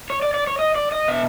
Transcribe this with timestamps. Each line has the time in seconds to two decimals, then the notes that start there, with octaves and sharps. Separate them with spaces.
0.10 C#5
0.22 D5
0.34 D5
0.47 C#5
0.59 D#5
0.75 D5
0.92 D#5
1.08 B2 E5